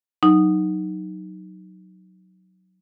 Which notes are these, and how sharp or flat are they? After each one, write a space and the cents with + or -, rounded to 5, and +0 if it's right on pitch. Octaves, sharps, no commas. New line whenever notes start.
F#3 +0 D#4 -5